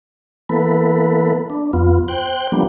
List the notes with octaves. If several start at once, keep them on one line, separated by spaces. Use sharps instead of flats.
E3 A#3 B3 A4 B4
D4
F2 B3 F4
C5 G5 F#6
F3 G3 A#3 B3 D4